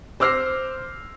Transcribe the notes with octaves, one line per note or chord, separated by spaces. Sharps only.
C5 D6 E6 F6 A#6 C7